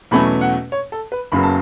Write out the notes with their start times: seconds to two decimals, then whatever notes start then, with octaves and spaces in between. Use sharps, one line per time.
0.11 E2 B2 F#3 A3 C#4 B5
0.41 F#5
0.72 C#5
0.92 A4
1.12 B4
1.32 F#1 F#2 C#3 F#3 B3 B5
1.43 A5